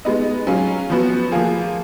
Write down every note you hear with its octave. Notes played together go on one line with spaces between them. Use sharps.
G#3 B3 D#4
F#3 C#4 F4 G#4
F3 B3 F#4
F3 A#3 F4 G#4